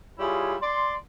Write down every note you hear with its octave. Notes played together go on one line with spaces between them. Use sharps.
G3 E4 F4 G#4 C#5
D5 C6